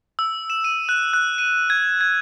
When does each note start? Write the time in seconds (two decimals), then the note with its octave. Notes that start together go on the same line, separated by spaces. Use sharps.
0.19 E6
0.50 E7
0.64 D#7
0.89 F#6
1.13 F#6
1.38 D#7
1.70 G#6
2.01 G#6